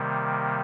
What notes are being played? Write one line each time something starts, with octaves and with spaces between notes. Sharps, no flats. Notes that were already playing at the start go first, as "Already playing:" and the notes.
Already playing: C3 D#3 G3 A#3